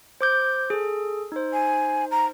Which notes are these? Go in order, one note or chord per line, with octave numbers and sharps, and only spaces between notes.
C5 D6 G6
G#4 A4
D#4 C5
G#5
A#5